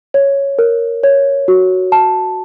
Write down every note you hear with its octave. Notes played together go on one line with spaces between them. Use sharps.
C#5
A#4
C#5
F#4
A5